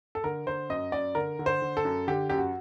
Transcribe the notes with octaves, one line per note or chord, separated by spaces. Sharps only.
A4
D3 A#4
D3 C5
F#2 D#5
F#2 D5
D3 A#4
D3
C5
D3
A4
F#2
D3 G4
F#2 G4
F#4